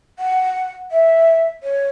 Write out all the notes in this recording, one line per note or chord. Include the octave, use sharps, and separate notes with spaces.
F#5
E5
C#5